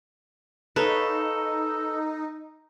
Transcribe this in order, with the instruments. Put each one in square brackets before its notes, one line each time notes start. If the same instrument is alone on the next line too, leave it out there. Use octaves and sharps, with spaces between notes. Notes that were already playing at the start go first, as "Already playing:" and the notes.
[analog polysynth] D#4 [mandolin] A4 [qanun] B4 C#5 F5